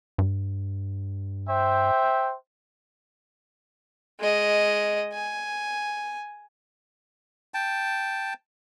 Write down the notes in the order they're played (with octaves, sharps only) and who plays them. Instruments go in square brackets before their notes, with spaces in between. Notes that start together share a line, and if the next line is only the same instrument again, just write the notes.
[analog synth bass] G2
[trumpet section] C5 E5 G5
[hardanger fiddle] G#3 D#5
G#5
[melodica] G5 A5